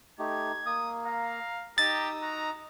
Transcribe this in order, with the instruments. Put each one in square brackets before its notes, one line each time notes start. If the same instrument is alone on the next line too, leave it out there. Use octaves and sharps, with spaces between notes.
[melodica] A3 D#4 G4 [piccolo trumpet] G#6
[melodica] A#3 [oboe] D#6
[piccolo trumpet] F5 [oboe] A#5
[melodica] D#4 D#6 E6 [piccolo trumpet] G4 [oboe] A#5 [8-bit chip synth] A6
[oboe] F#4 [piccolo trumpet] A#5